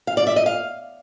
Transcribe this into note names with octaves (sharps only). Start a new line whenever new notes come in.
F5
D5
E5
D#5
F5